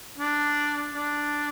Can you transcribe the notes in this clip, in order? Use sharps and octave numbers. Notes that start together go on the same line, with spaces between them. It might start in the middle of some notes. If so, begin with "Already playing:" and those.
D4
D4